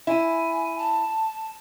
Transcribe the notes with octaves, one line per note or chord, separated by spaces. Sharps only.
E4 G#5
A5